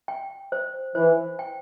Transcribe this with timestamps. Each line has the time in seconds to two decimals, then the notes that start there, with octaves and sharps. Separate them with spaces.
0.08 G5
0.52 C5
0.95 E3 C5
1.39 G5